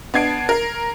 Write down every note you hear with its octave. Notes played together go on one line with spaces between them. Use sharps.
B3 D4 G#6 C7 D7
A#4